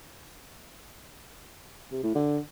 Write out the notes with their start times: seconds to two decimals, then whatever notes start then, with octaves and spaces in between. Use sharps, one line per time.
1.92 C3
2.03 A2
2.15 D3